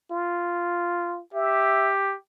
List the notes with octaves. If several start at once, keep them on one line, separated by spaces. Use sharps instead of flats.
F4
G4 E5